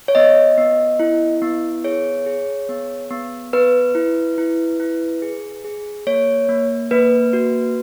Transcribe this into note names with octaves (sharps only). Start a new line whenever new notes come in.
C#5
B3 D#5
B3
E4
B3
G#4 C#5
G#4
B3
B3
B3 B4
E4
E4
E4
G#4
G#4
A#3 C#5
A#3
A#3 B4
F#4